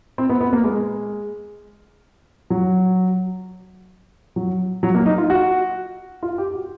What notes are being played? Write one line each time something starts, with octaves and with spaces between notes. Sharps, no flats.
C4
B3
B3
A#3
G#3
F#3
F#3
F#3
A#3
D#4
F4
F#4
F4
G4
F#4